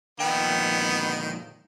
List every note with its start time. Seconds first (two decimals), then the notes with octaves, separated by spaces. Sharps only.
0.20 F2 A#2 D#3 B3 G5